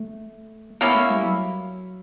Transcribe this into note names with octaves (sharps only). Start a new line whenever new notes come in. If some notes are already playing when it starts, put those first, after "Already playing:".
Already playing: A3
A#3 B3 C#4 E4
A3
G3
F#3